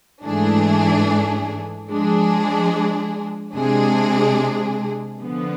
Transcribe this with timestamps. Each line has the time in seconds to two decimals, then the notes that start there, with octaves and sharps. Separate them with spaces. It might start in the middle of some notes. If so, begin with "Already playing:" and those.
0.24 G#2 E3 A3 D4 G#4
1.90 F3 G#3 D4 G#4
3.55 C3 G#3 D4 G#4
5.20 D3 F3 B3